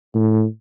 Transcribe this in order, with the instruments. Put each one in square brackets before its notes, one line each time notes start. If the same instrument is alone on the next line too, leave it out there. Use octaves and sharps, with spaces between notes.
[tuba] A2